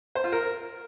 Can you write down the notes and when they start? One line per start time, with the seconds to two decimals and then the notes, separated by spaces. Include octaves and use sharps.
0.15 C5
0.24 F4
0.32 A#4